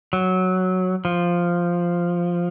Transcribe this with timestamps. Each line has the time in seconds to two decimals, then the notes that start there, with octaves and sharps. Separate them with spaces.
0.13 F#3
1.05 F3